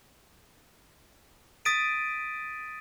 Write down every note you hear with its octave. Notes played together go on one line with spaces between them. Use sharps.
D#6 A6 B6 D7 D#7